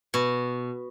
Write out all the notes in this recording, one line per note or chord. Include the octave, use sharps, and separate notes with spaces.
B2